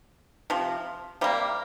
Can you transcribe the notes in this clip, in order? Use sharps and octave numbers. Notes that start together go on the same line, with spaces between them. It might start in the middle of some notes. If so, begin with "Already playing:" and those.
C3 F3
C3 G3 A#3